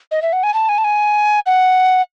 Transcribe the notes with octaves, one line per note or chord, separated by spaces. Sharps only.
D#5
E5
F#5
G#5
A5
G#5
A5
G#5
F#5